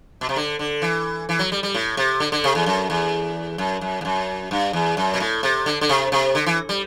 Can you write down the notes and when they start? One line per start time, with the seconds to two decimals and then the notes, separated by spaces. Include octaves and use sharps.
0.21 B2
0.29 C3
0.36 D3
0.59 D3
0.82 E3
1.29 E3
1.39 F#3
1.52 G3
1.63 G3
1.74 A2
1.97 C3
2.20 D3
2.32 D3
2.44 C3
2.55 E2
2.66 F#2
2.90 E2
3.58 F#2
3.81 F#2
4.01 E2
4.05 F#2
4.51 G2
4.73 E2
4.97 F#2
5.14 B2
5.20 A2
5.43 C3
5.66 D3
5.81 D3
5.89 C3
6.12 C3
6.35 D3
6.46 E3
6.69 G3